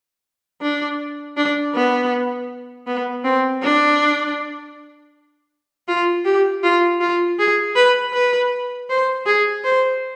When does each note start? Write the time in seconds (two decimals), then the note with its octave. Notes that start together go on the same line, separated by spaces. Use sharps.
0.62 D4
1.37 D4
1.75 B3
2.87 B3
3.25 C4
3.63 D4
5.88 F4
6.25 G4
6.64 F4
7.01 F4
7.39 G#4
7.76 B4
8.13 B4
8.90 C5
9.26 G#4
9.64 C5